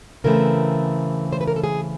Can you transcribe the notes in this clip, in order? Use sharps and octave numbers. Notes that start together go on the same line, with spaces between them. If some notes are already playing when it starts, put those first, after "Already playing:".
C#3 E3 A3 C4 A#4
C5
B4
A#4
A4
G#4